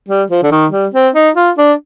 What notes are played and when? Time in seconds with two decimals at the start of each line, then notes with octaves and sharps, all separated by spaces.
0.08 G3
0.30 F3
0.43 D3
0.51 D#3
0.72 G3
0.94 C4
1.15 D#4
1.36 F4
1.58 D4